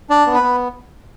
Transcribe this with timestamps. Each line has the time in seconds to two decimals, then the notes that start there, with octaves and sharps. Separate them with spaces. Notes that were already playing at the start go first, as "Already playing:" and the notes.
0.10 D4 D5
0.26 B3
0.34 B4
0.43 B3